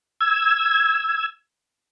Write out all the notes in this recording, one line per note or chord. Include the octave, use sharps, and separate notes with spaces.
E6 G#6